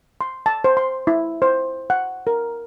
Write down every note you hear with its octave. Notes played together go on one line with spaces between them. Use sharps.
C6
A5
C5
C6
E4
C5
F#5
A#4